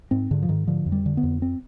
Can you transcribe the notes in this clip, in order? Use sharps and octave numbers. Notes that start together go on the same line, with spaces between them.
G#2 C4
G#2 D3
F3
G#2 D#3
D3 F3
F2
G3
D3
B3
F2
C4